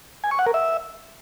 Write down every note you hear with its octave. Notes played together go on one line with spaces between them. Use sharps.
G#5
C#6
F#5
A#4
E5